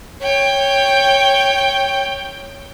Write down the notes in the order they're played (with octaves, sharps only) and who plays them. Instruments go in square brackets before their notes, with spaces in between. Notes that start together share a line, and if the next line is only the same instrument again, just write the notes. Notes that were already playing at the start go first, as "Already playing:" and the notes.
[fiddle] C#5 G5